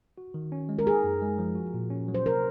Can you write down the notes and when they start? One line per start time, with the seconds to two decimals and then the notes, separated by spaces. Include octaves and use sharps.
0.18 F#4
0.34 D#3
0.52 C#4
0.69 G#3
0.79 A#4
0.86 D#4 G#4
1.04 F#2
1.22 G#3
1.38 F3
1.55 F#4
1.74 A#2
1.90 C#4
2.08 F#3
2.14 C5
2.26 C3 A#4